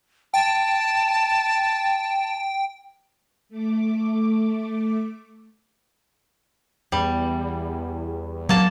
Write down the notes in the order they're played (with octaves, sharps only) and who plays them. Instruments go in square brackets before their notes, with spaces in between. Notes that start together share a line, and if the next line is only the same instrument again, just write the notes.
[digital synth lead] G5 [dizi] A5
[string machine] A3 D6
[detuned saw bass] E2 [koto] G3
[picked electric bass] F#3 [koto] A#3 A5